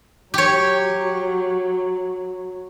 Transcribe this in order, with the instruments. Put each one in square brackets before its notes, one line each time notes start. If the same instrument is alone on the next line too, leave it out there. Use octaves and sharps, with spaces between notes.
[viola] F#3 [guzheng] G4 C#5